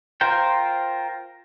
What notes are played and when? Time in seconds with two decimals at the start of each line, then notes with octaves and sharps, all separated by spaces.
0.21 F4 A#4 C5 G5